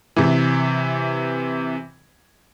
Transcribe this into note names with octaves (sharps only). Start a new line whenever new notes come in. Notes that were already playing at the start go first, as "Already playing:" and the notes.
C3 E3